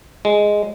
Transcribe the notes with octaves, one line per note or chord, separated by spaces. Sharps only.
G#3